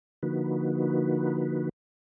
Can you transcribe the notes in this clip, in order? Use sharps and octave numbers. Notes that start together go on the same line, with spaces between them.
D3 F3 A#3 D#4 F#4 B4